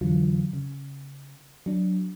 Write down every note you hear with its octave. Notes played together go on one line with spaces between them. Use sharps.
F2 D3 E3 F#3 F4
C#3
F#3 D4